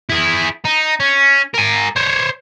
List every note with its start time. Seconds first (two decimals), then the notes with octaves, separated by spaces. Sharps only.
0.09 E4 G#4
0.65 D#4
1.00 C#4
1.54 A#4 G#5
1.96 C5 C#5